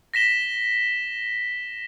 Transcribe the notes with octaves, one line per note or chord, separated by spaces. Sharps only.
A#6 B6 E7 G7